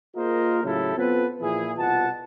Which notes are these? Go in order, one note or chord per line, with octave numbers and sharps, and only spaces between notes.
A#3 F4 G#4 A#4 C5 D#5
A2 C#3 F#3 E4 G4 A4
B3 C4 F4 A4 B4
A#2 E3 F3 E4 G#4
C2 B2 F4 F#5 A5